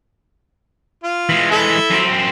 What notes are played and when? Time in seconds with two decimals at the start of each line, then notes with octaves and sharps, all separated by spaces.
1.04 F4
1.29 E3 G#3
1.51 E4 A4 E5
1.90 F#2 C4